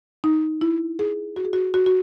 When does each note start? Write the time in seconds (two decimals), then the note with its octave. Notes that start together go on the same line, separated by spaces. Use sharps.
0.24 D#4
0.61 E4
0.99 G#4
1.36 F#4
1.45 G#4
1.53 F#4
1.74 F#4
1.86 F#4